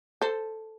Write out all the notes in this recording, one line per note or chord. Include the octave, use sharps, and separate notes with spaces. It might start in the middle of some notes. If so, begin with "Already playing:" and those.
A4 C5